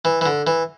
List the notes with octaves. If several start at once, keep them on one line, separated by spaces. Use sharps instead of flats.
E3
E3
D3
E3